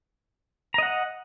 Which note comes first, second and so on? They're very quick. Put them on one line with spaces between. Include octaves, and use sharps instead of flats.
A#5 D#5 F#5